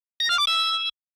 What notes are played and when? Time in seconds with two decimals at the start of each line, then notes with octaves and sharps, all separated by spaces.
0.20 A#6
0.29 F6
0.38 D6
0.47 E6